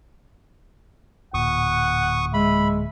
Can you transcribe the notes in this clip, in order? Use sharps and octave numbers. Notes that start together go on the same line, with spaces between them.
D1 A#2 F#5 C#6 D#6
G#3 E5 B5